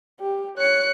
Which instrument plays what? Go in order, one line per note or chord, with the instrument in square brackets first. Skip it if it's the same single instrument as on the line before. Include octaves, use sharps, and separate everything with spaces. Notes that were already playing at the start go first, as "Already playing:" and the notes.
[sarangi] G4
[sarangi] C#5 [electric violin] F#6 C#7